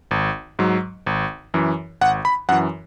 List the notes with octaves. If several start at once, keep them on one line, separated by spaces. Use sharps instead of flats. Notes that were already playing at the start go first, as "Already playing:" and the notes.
G#1
G#2 F#3
G#1
F#2 E3
G#1 F#5
B5
F#2 E3 F#5